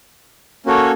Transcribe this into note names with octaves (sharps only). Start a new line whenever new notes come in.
A#3 C#4 F#4 A4 C#5